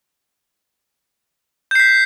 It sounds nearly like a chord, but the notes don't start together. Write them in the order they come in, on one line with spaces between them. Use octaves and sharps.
G6 C7 B6